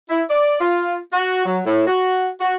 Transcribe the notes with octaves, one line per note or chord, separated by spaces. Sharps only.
E4
D5
F4
F#4
F#3
A2
F#4
F#4